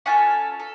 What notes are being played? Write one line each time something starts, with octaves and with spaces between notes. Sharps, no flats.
C#4 F4 A4 F#5 G#5
A4